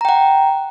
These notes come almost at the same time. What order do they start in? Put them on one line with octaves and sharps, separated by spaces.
A#5 G5 F#5